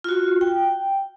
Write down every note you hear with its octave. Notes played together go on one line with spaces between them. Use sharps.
F4 F#4
G5